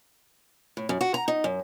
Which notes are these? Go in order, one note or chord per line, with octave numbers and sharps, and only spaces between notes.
A2
F#2
F#4
A#5
D#4
F#2